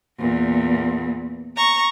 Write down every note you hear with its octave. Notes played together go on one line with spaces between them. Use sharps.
E2 A#2
A#5 C#6